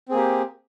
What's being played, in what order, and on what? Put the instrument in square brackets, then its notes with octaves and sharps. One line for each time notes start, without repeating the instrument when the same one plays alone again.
[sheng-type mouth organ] C4
G#4
A#3
G4